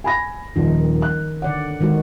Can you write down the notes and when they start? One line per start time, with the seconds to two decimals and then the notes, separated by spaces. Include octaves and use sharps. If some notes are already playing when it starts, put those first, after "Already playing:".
0.04 G#5 B5 A#6
0.56 D#1 D#3 F3 D#4
1.02 F#6
1.42 D3 D5 F#5
1.81 D#3 G#3 F#4